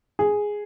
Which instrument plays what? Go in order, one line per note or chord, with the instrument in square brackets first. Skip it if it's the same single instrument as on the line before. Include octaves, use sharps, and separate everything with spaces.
[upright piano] G#4